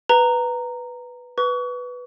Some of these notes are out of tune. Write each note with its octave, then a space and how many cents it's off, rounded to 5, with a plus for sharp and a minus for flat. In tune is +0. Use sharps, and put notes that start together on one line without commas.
B4 +0 A#5 -10
B4 +0 C#6 +35